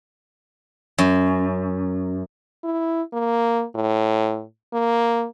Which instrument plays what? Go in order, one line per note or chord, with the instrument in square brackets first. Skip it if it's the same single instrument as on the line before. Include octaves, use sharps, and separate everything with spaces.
[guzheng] F#2
[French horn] E4
A#3
A2
A#3